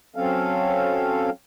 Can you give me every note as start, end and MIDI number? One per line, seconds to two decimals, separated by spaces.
0.16 1.30 54
0.16 1.30 60
0.16 1.30 61
0.16 1.30 69
0.16 1.30 77